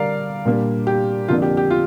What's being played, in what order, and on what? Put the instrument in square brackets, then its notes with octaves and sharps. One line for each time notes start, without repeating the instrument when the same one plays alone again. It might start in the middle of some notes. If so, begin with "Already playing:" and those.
Already playing: [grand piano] D3 G3 D4 A#4 D5 F5
A#2 G3 A#3 D4
G4
F2 D3 A#3 D4 F4
G4
G4
F4